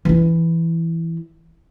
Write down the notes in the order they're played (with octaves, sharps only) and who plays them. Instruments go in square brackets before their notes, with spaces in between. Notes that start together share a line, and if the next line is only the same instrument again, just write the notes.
[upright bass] E3 E4